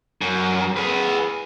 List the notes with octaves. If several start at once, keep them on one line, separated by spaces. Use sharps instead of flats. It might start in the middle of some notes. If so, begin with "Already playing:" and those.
F#2
G#4 B4